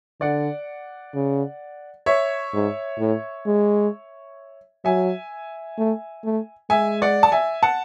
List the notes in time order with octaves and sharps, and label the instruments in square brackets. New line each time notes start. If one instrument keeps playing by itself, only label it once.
[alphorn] D3 [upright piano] D5 F#5
[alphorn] C#3
[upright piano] C#5 E5
[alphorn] G#2
A2
G#3
[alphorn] F#3 [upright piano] E5 G#5
[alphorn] A3
A3
[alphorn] G#3 [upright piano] E5 G#5
[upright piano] D5 F#5
A5
E5 G#5
F#5 A5